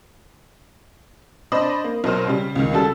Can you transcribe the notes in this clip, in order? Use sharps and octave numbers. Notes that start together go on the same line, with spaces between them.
D4 C5 D5 D#5 B5 D#6
A#3
B1 B2 A#4 C5 F6
C#3 G3
C#2 D#3
C#3 G3 F#4 A4 A5 E6